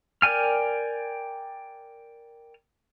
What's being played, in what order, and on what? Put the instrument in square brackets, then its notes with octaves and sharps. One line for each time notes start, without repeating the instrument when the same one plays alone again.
[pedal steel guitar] A#4 D5 G5 G#5 F6